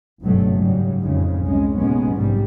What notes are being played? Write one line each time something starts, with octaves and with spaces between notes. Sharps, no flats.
F#1 C#2 G2 B2 F#3 A3
G#2 C#3 F#3 G3
A1 F2 G#2 C#3
C2 G#3 C#4
A1 D#2 B2 G#3 B3 C#4
A#1 G#2 C3 G3